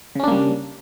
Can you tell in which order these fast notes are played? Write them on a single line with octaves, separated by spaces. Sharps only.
C#3 C#4 D4 A#3 G3